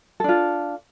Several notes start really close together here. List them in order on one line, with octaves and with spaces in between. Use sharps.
A4 D4 F4